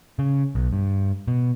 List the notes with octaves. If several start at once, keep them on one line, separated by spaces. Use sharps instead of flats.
C#3
B1
G2
B2